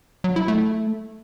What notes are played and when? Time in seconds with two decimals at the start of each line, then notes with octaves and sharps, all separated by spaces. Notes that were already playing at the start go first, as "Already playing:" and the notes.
0.24 F#3
0.36 E4
0.48 A3